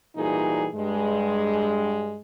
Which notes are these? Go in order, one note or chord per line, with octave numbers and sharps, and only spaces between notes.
A#2 E3 G3 D#4 F#4 G#4
G2 G#3